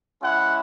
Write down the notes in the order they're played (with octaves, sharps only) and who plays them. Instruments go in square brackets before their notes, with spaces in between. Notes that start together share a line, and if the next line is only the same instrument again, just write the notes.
[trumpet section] G#3 C#4 E4 F#5